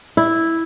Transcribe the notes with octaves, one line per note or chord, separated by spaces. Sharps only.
E4